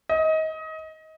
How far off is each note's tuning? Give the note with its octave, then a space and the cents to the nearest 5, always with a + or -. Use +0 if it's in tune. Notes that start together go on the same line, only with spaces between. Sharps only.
D#5 +25